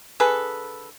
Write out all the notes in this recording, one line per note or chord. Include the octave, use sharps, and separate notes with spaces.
D3 G#4 A4 B4